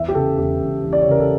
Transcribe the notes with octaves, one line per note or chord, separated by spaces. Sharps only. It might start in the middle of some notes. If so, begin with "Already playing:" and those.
Already playing: E2 E5
G4
C#3 A4
E1 G4
E1
E2
D5
C#5
C#3 A#4
A4